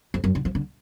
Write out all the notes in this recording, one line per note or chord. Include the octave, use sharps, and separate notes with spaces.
F2
F#2
D3
F3
D3